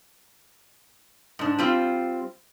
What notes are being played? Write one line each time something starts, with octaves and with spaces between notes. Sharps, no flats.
G#2 D4
G3 C4 F4